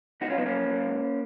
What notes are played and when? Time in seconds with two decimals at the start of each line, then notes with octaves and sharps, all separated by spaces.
0.21 C#2 D#4 F#4
0.30 C#4 F4
0.37 F#3 B3 D#4
0.46 A#3 C#4
0.54 F2
0.70 F#3
0.86 G#2